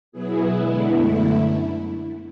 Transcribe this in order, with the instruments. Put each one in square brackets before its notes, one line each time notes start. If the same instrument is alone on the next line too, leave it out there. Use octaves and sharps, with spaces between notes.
[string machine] B2 F#3 B3 E4 G#4
D3 G#3 B3 E4
F#2 D3 A3 E4